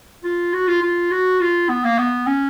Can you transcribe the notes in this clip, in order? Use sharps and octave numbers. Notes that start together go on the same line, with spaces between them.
F4
F#4
F4
F4
F#4
F4
B3
A#3
B3
C#4